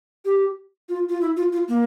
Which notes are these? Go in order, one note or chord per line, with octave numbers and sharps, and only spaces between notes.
G4
F4
F4
E4
F4
F4
A#3